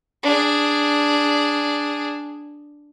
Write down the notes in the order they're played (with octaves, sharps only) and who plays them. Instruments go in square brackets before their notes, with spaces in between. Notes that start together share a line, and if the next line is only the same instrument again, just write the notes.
[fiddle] D4 G#4